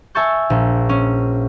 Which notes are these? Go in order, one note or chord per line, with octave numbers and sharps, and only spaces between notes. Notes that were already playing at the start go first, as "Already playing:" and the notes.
E5 G#5 A5 C#6 G6
A#1
C#4